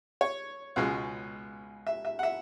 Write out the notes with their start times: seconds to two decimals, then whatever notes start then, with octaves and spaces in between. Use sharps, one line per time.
0.21 C#5
0.76 C#2 B2 G#3 C#4
1.87 E5
2.05 E5
2.19 F#5
2.23 E5